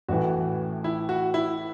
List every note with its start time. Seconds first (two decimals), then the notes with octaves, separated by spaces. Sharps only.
0.08 A1 A2 E3 F#4
0.84 E4
1.09 F#4
1.34 E4